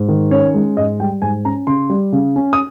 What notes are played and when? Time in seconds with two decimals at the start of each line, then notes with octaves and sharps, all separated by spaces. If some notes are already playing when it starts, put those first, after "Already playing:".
Already playing: G#2
0.09 D#3
0.31 C#4 C#5
0.54 G#3
0.77 G#2 D#5
1.00 G3 G5
1.22 G#2 G#5
1.45 C#4 A#5
1.67 C#3 C6
1.90 G3
2.13 C#3
2.36 C#4
2.53 D#6